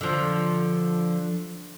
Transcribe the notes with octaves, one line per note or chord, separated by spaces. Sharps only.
D3 F3